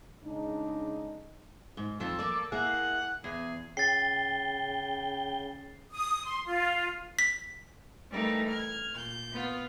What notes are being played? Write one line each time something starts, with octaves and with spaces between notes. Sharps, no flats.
C#3 G#3 D4 D#4
G#2
F2 F3 A4
A#3 D5
A#3 E4 G#4 F#5
E2 G#4
C#3 G5 A6 C7
D#6
C6
F4
B6
E3 G3 A3 A#3 D#4
F6 G#6
A#2 G6
B3 F4